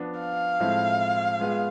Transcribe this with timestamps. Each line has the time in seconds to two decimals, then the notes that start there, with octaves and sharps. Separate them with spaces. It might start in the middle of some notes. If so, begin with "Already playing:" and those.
Already playing: F3 B3 D4
0.20 F5
0.60 A2 F3 G#3 C4 E4
1.40 G#3 B3 F4 G#4